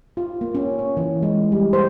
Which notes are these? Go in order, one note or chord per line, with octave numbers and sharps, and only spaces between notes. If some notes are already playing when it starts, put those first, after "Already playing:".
F4
A#3
C#4
C#5
E3
G#3
G3
C5